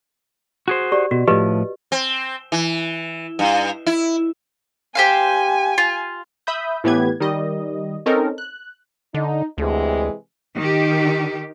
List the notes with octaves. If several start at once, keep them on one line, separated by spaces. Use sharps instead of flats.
F#4 G#4 C5
G4 D5
B2 F#4
A2 F3 G4 B4 D#5
C4
E3
G2
E4
G4 C5 F5 G#5
F4
E5 B5 D#6 G6
A2 E3 B3 G4 B4 G#6
D#3 G3 D#5
C4 C#4 D#4 A4 A#4
F#6
D3 D#4
D2 C3 E3 G#3
D#3 G4